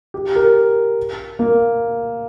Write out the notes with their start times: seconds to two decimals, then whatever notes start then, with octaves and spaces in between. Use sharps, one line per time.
0.14 G4
0.35 A#4
1.39 A#3